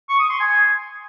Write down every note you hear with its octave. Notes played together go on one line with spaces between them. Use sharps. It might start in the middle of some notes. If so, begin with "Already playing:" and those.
C#6
D#6
C6
G#5